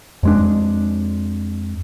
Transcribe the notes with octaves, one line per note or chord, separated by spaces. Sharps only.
F2 G#3 D4